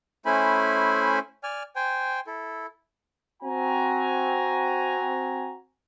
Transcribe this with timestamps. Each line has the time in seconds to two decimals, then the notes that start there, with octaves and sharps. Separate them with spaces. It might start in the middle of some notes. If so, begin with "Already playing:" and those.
0.25 A3 C#4 E4 C5 G#5 B5
1.43 D5 G#5 F6
1.76 C5 G5 G#5
2.27 E4 A4
3.43 C4 F#4 G#5 A#5